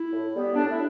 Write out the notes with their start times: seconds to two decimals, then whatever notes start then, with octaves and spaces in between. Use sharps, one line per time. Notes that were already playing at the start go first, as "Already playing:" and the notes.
Already playing: E4
0.13 A2
0.34 G3 B3
0.55 A2 D4
0.70 E4